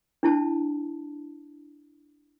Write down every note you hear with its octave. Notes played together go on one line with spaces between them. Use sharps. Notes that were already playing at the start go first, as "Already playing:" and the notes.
D4 E4 A5